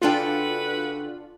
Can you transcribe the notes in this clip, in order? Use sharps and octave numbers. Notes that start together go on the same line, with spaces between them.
C#3 D4 F4 F#4 A4 B4 G5